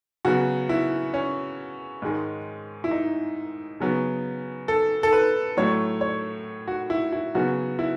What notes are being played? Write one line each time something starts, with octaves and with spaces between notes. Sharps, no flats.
C#3 F#3 B3 F#4
E4
C#4
G#2 D#3 G#3
E4
D#4
C#3 F#3 B3
A4
A4
B4
A2 F#3 A3 C#5
C#5
F#4
E4
E4
C#3 F#3 B3 F#4
E4